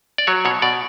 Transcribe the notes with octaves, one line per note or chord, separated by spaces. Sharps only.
D5
F#3 C#5
B2 C#5
B2 D5